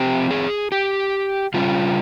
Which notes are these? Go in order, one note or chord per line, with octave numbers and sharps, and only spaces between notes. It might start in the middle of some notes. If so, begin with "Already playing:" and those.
Already playing: F3 C4 G4
G#4
G4
C#3 G3 C#4 F4